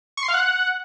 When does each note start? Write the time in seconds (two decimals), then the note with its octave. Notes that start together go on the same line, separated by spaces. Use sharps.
0.17 C#6
0.23 C6
0.28 F5
0.34 F#5